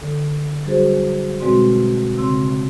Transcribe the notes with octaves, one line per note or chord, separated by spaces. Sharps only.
D3 A4
F#3 G3 D4 F#4 G#4 C5
B2 G#3 C4 F#4 D5 C6
C#3 C4 C6 E6